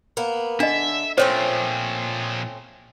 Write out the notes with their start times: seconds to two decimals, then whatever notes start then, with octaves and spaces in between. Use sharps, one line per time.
0.17 A#3 B3
0.60 D3 D4 D#5 E5
1.18 A#2 F3 A3 C4 C#4 C5 C#5